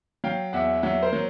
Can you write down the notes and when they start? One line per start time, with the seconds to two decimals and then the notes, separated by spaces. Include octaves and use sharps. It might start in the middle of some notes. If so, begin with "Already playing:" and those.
0.24 F#3 F5 G5
0.53 E2 E5 F#5
0.83 F#3 E5 F#5
1.03 A#4 C5
1.13 F#3